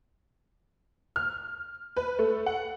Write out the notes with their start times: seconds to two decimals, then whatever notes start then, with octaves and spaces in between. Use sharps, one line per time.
1.16 F6
1.97 B4
2.19 A3
2.46 F#5